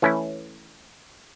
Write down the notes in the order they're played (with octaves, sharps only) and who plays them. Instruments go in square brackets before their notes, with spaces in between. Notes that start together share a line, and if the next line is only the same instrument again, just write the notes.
[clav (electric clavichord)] E3 A3 C#4 E4